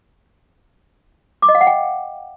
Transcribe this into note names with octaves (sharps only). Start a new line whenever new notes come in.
D6
D#5
F5
F#5
G5